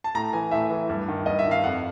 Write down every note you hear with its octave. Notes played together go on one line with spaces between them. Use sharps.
A5
A2 A#5
E3 G#5
A2 E5
E3
G2
D#3
G2 D#5
E5
D#3
F5
F2 F#5